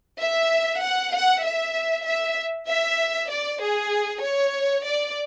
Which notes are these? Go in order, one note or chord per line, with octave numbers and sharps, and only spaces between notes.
E5
F#5
F#5
E5
E5
E5
D5
G#4
C#5
D5